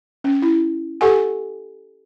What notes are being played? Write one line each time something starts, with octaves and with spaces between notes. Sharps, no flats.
C#4
E4
G4 A4 F#5 G#5